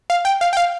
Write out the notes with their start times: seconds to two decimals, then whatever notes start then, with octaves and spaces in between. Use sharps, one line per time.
0.10 F5
0.25 G5
0.41 F5
0.53 G5
0.57 F5